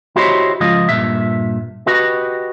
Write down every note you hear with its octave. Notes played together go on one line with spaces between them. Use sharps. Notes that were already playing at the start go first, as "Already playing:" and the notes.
E4 F#4 G4 C5 C#5 D#5
C#2 G#2 F3 F4 D#5
G2 A#2 E5
F#4 G4 B4 D#5